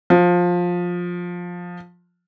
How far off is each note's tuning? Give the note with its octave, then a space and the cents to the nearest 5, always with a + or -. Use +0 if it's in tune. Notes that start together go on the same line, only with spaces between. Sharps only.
F3 +15